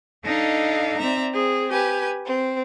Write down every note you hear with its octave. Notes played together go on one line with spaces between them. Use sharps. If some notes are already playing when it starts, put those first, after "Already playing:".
D4 D#4 A4 D#5 F5
C4 D5 E5 A#5
C4 G#4
G4 B4 G#5
C4